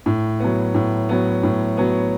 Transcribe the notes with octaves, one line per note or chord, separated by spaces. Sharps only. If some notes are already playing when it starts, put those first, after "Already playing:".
A2
F#3 B3
A2
F#3 B3
A2
F#3 B3